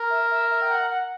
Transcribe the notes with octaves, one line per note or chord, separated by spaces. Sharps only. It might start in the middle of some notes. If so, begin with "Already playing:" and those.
Already playing: A#4
E5
E5
E5
G5
F#5
F#5